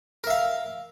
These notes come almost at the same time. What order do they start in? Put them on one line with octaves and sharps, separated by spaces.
A#4 E5 F5